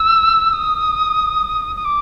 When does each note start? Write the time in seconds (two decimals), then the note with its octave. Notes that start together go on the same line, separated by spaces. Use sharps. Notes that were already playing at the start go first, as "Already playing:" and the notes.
Already playing: E6
0.52 D#6
1.75 D#6
1.84 D6